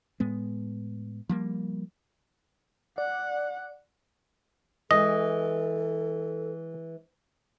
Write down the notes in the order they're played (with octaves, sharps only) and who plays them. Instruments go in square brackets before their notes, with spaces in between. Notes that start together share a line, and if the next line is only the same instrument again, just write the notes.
[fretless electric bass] A2 G#3 B3
F3 G3 A#3
[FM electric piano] D5 [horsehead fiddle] F#5
[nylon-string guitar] E3 G#3 [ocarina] A4 [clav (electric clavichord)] D#5